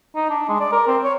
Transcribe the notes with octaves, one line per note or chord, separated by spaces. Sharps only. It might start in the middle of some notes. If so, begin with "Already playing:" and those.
D#4
D4
G#3
D5
A#4
C4
C#5